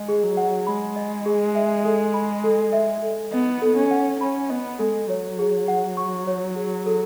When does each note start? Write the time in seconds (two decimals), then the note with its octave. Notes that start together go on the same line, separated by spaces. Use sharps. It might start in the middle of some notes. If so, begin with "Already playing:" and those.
Already playing: G#3 D#5
0.09 G#4
0.23 F#3
0.37 F#5
0.67 G#3 B5
0.96 D#5
1.26 G#4
1.55 E5
1.85 A4
2.14 B5
2.44 A4
2.73 E5
3.02 A4
3.33 B3 D#5
3.62 A4
3.77 C#4
3.91 F#5
4.20 C#4 B5
4.49 B3 D#5
4.79 G#3 A4
5.09 F#3 C#5
5.39 G#4
5.68 F#5
5.97 C#6
6.27 C#5
6.56 G#4
6.86 A4